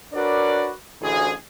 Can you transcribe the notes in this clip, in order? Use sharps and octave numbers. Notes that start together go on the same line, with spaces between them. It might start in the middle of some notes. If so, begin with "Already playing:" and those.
D4 F#4 A#4 B4 C#5 D5
A1 D2 G#4